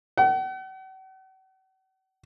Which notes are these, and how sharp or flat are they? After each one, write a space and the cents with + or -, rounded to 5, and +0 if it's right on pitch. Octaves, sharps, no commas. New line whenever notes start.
F#5 +45